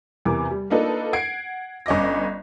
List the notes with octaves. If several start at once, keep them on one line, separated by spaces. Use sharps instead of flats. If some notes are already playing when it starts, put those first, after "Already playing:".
E2 C3 E3 A#4 D6
G3
A#3 D4 D#4 F4 A4 B4
F#5 G#6 C7 D7
G1 C#4 D#5 D6 A#6